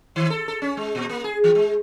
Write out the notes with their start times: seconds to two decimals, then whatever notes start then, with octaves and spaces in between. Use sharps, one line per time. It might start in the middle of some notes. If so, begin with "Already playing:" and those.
0.16 D#3
0.30 A4
0.48 A4
0.62 C#4
0.77 G#3
0.95 A#2
1.09 A#3
1.24 G#4
1.44 E3
1.55 G#3